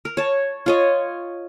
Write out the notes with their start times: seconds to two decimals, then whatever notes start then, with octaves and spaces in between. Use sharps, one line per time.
0.05 A#4
0.17 C#5 A5
0.66 F4 C#5 D#5